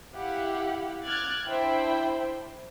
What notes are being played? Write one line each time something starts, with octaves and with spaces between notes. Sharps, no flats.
E4 G4 F5 F#5
D6 F6 F#6 G#6 A6
D4 E4 C5 E5 G5